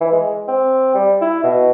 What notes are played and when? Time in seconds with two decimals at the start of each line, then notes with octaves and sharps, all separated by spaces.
0.01 E3
0.12 G#3
0.48 C4
0.95 G3
1.22 E4
1.43 B2